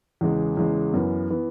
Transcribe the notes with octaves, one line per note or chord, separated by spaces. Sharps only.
E2 C#3 G#3
E2 C#3 G#3
F#2 E3 B3
E3 B3